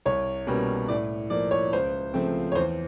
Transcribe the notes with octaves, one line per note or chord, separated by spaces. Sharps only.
C2 C#5
B2 G3 A#3 C#4
A2 D5
F3 A#3 D5
C#5
C#2 C5
C#3 F3 A3 C4
C#5
E2 C5